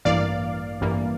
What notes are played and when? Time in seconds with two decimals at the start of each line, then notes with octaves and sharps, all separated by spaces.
0.05 A1 G2 E3 A#3 D5 F5
0.81 A1 G2 E3 A#3